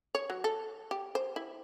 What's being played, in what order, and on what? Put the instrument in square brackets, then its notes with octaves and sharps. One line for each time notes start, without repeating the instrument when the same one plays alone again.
[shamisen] C#5
F#3
A4
G4
C5
E4